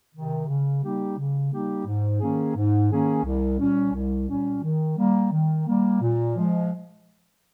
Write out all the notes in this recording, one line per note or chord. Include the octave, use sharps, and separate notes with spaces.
C3 D#3
C#3
G3 A#3 D#4 G4
C#3
G3 A#3 D#4 G4
G#2
D#3 A#3 C#4 G#4
G#2
D#3 A#3 C#4 G#4
C2
A#2 G3 C#4
C2
A#2 G3 C#4
D#3
G3 A#3
D#3
G3 A#3
A#2
F3 G#3